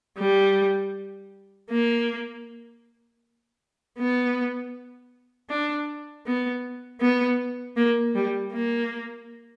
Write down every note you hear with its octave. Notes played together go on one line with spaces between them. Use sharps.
G3
A#3
B3
D4
B3
B3
A#3
G3
A#3